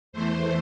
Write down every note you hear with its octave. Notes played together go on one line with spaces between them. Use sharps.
E2 E3 A3 C5